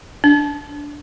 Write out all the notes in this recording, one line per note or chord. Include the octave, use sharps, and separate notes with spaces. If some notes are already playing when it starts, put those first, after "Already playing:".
D4